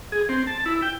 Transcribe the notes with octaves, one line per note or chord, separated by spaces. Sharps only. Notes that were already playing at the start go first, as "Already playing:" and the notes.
G#4
C4
A5
E4
G5